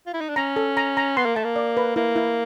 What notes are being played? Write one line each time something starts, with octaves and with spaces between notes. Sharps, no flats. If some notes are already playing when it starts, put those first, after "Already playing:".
F4
E4
D#4
D4
C#4 A#5
A4
A#5
A#5
B3 C6
A#3
A3 A5
A#3
D5
B4
A#3 E4
E4